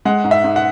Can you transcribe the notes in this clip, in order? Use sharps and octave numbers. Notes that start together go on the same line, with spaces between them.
G#3 F#5
G#2
E5
G#2
F#5